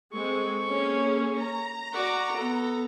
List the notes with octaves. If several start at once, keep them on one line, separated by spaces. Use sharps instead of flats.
G#3 C4 A4 C#6
A#3 C#4 G#4
A#5
F#4 D5
B3 A4